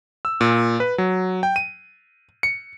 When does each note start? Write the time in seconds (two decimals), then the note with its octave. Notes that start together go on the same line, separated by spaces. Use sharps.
0.25 E6
0.41 A#2
0.80 B4
0.98 F#3
1.43 G5
1.56 D#7
2.43 C#7